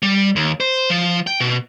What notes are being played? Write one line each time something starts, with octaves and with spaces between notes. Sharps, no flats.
G3
D#2
C5
F3
G5
B2